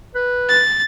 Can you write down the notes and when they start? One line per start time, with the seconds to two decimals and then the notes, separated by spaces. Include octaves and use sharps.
0.15 B4
0.49 A6